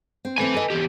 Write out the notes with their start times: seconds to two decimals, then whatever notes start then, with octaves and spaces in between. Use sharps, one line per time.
0.25 C4
0.38 A3 C4 B4 G#5
0.54 A4 D#5
0.70 E2 G4